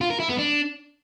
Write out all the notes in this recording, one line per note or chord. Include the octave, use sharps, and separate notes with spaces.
F4
A#4
E4
B3
D4